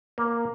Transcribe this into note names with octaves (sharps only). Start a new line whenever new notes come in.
A#3